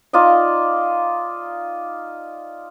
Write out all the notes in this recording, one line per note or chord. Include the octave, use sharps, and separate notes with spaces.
D#4 F4 D5 D#5